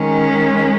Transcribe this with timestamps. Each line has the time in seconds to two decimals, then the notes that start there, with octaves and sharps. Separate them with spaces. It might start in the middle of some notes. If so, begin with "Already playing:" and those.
Already playing: D#3 G#3 C#4